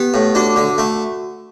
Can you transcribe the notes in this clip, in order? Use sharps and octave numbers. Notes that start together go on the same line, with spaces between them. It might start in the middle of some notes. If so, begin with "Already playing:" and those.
Already playing: B3 G4
A2
D4 F#4
D3
A3